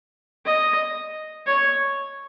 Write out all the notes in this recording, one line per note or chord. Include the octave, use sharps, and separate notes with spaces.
D#5
C#5